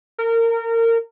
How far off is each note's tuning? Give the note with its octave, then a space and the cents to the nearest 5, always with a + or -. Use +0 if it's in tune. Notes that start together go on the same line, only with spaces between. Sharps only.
A#4 -25